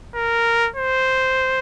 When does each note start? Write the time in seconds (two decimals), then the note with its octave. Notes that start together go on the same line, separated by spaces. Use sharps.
0.15 A#4
0.76 C5